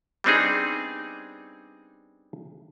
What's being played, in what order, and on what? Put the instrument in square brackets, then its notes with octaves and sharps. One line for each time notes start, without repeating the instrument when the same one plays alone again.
[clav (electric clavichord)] G3 B3 C4 D4 D#4 G#4